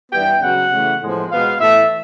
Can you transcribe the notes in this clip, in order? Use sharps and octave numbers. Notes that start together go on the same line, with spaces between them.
G2 E3 G3 B3 G5
C#3 F#3 B3 F#5
C#3 E3 A3
A2 F3 G#3 B3
B2 G#3 B3 F5
A2 E3 A3 E5